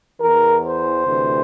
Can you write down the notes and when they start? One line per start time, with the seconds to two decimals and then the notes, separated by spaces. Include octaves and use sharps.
0.20 E2 E3 A#4
0.63 C5
1.05 D2 C3 E3